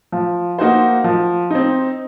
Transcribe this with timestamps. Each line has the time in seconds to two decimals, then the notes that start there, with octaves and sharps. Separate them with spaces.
0.12 F3
0.59 A#3 D#4 F#4 C5
1.04 F3
1.51 C4 D#4